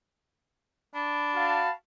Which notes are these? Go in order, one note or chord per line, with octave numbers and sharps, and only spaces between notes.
D4 B5
F#4 F5 A5